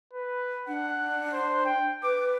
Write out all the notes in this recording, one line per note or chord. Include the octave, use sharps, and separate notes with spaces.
B4
D4 F#5
C5
G5
B4 D6